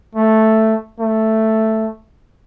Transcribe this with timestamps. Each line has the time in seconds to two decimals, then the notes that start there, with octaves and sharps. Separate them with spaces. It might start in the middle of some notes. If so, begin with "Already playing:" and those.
0.15 A3
1.00 A3